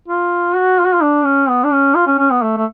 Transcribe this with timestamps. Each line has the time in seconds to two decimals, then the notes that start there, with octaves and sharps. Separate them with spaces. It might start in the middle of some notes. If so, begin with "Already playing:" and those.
0.08 F4
0.56 F#4
0.79 F4
0.86 F#4
0.93 F4
1.01 D4
1.25 C#4
1.49 B3
1.64 D4
1.72 C#4
1.95 F4
2.07 C#4
2.19 C#4
2.31 B3
2.42 A3
2.57 A3